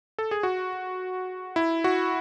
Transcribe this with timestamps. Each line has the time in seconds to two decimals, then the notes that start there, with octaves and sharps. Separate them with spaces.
0.19 A4
0.31 G#4
0.43 F#4
1.56 E4
1.84 F#4